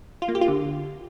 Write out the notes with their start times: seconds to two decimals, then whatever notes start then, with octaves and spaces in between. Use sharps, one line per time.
0.22 F4
0.28 A#3
0.35 G4
0.41 F4
0.48 D3